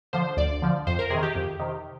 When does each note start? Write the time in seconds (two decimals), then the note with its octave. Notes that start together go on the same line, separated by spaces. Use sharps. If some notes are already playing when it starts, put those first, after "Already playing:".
0.13 D3 F3 C5
0.37 D2 D5
0.62 D3 F3
0.87 F2 C5
0.99 A#4
1.10 C3 D#3 G#4
1.23 G4
1.35 F2
1.60 C3 D#3